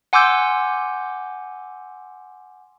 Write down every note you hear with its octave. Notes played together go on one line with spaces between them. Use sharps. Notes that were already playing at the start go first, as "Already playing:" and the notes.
F#5 G#5 C6 D6 E6 G6